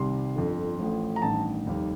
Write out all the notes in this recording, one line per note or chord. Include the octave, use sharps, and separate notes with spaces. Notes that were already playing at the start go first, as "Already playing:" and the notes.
Already playing: C2 C3 D#3 G3 C6
G1 F2 D3
A1 A2 F3
A#5
A1 G2 D#3 A5
F1 D#2 D#3 G3